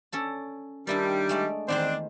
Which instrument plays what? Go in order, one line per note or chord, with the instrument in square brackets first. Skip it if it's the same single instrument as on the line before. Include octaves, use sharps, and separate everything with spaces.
[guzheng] C#4 A4 D5
[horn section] D#3 G3 [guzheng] D4 E4 D5
[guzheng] G#3 A3 D5
[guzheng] E2 D#3 C5 [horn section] C4 D4